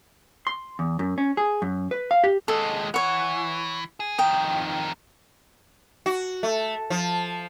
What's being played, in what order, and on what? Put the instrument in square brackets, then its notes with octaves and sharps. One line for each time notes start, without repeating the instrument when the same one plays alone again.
[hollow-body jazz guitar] C6
E2
F#2
C#4
G#4
F#2
B4
F5
G4
[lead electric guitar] D#2 G#3 [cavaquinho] A4
[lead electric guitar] E3 [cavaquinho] C#5 F#5
[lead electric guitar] G#4
[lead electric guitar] F2 D#3 [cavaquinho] G5 D#6
[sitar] F#4
A3
F3